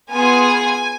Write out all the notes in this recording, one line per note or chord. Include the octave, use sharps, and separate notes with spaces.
B3 F4 G#4 G#5